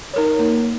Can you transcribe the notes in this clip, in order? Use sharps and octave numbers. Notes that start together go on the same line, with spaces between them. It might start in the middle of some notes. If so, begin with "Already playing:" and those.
D#4 A#4 C#5
A#3